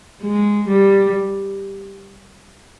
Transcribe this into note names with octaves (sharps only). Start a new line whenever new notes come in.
G#3
G3